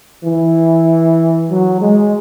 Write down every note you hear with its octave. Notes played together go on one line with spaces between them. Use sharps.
E3
F#3
G#3